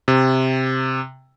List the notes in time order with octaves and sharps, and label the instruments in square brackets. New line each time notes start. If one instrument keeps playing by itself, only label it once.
[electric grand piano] C3